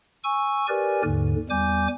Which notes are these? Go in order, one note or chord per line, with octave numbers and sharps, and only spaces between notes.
G#5 C#6 E6
G4 A#4 B4 D5 G#5
D#2 G#2 D3
E2 G3 G#5 D6 G6